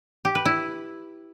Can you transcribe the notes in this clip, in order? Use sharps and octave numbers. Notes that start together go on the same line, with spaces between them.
G4
B4
E4